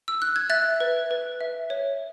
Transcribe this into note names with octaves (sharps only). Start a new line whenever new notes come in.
E6
F#6
G#6
E5 F#6 A6
B4
B4
E5
C#5